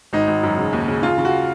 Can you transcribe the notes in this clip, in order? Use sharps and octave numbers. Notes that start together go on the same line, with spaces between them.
G#1 D#4
G#1
F#2
C#3
D#2
C#3
C#3 F4
C#3
F#4